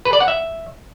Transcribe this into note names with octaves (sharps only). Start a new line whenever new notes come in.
B4
D5
F#5
E5